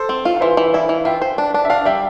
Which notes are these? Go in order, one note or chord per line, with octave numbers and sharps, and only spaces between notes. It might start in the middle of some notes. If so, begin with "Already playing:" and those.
Already playing: A4 C5
C4
F4
F5
E3 C5 E5
E3
E4 D5 F5
E3
F4 E5 G5
C5
D4
D4
E5
D4 D5 F5
G3 E5 G5